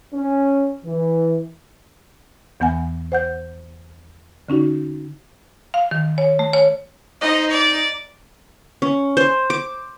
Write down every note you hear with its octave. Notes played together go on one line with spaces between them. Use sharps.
C#4
E3
E2 E3 B3 F#5 G#5
C5 F#5 G6
D3 C#4 D#4 F#4
F5
D#3
C#5
A3
C#5
D#4 C5 D#5
D5
C#4
C5
D6